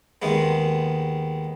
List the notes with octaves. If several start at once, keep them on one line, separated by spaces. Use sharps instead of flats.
D#2 D#3 G#3 B3